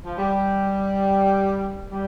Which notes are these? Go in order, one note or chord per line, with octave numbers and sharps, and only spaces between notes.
F3
G3
G3